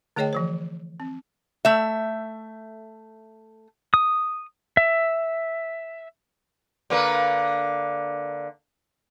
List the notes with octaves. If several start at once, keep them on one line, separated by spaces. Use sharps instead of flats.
D3 A3 G#4 C#5 D#5 G5
E3 F3 C5
C4
A3 E5
D#6
E5
D3 A#3 B4